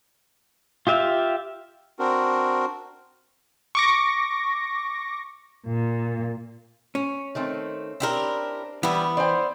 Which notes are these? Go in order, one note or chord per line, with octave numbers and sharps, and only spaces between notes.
F4 G4 E5 F5
C4 D4 F#4 A#4
C#6 D6 A#6
A#2
C#4
D#3 A3 C4
C4 D4 E4 G4 A#4
E3 G3 B3 E4
C5 D5 G5